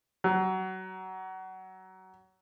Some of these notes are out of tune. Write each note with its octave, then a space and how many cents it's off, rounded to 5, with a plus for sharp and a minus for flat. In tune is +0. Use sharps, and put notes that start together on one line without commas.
F#3 +25